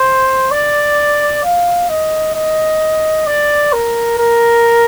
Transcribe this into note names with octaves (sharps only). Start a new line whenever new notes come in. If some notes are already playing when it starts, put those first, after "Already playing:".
Already playing: C5
D5
F5
D#5
D#5
D5
A#4
A#4